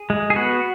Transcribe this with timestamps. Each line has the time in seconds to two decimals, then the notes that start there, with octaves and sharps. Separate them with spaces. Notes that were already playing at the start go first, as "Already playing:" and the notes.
Already playing: G#4
0.10 G#3
0.30 G#4
0.36 B3 F#4